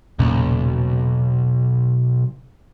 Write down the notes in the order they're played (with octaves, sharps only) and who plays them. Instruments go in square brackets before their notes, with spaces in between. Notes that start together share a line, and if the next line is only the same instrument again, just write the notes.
[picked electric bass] E1 A#2 C#3 [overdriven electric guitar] B1